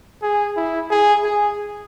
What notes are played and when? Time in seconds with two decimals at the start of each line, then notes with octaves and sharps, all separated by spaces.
0.22 G#4
0.56 E4
0.91 G#4
1.24 G#4